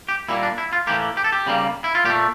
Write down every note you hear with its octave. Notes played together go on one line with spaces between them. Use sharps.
G4
A#2 G3 A#3 E4
D4
E4
F4
A2 E3 A#3 G4
G4
A4
G4
C#3 G3 A#3
E4
F4
A#2 G4
A3